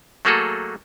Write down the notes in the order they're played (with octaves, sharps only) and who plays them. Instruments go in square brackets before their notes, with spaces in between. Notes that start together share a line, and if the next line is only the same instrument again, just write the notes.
[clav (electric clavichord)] F#3 A3 A#3 F#4 G#4 A4